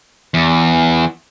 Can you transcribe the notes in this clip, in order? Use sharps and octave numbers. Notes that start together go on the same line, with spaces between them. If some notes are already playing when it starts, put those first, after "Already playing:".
E2